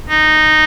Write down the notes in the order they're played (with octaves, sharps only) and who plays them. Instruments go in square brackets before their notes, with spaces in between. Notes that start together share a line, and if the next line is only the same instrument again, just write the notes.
[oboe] D#4